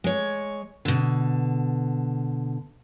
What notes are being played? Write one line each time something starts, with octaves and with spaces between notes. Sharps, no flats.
G#3 C#5
B2 D3